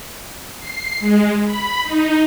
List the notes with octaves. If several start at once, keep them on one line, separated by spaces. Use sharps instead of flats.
C7
G#3
B5
D#4